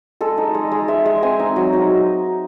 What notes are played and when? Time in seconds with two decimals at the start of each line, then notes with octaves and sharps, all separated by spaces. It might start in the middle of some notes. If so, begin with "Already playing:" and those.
0.21 G#3 A4
0.38 D#4
0.54 G#3
0.71 G#3
0.88 G#3 E5
1.06 G#3
1.22 C4 G#5
1.39 D#4
1.56 F#3
1.73 D#4